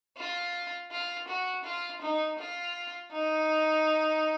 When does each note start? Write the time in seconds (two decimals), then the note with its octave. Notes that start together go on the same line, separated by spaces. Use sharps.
0.18 F4
0.92 F4
1.28 F#4
1.65 F4
2.02 D#4
2.39 F4
3.13 D#4